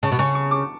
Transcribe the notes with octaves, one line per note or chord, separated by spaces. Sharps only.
C#3 A5
B2
C#3 C#6
C#6
D6